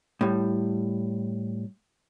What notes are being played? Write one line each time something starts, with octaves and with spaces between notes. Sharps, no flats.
A2 G3